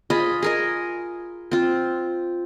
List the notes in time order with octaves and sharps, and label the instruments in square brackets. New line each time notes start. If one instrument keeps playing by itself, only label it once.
[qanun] F4 G#4 D#5 B5
G#4 A#4 D#5
C4 F4